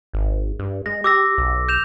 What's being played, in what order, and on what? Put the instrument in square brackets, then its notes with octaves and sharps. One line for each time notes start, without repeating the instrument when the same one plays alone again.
[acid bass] G#1
G2
[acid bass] G#3 [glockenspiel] A#6
[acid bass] G4 [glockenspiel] D6 E6 A#6
[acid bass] B1
[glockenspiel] G6 E7 F7